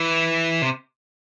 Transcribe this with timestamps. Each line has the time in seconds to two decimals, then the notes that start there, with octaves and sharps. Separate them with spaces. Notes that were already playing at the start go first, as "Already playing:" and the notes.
Already playing: E3
0.62 C3